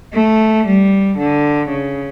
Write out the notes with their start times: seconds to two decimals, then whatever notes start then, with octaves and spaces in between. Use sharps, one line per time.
0.13 A3
0.66 G3
1.17 D3
1.68 C#3